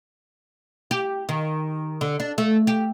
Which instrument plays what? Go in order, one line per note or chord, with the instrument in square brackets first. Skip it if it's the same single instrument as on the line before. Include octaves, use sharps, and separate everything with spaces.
[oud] G4
D#3
D3
D4
A3
G4